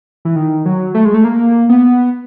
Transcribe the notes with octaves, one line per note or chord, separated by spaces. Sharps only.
E3
D#3
F#3
A3
G#3
A3
A#3
B3